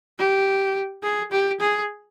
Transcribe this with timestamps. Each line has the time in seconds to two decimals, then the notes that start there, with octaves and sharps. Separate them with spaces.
0.19 G4
1.03 G#4
1.32 G4
1.60 G#4